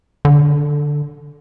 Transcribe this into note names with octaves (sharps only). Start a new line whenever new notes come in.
D3